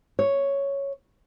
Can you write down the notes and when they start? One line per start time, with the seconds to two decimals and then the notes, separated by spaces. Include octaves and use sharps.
0.19 C#5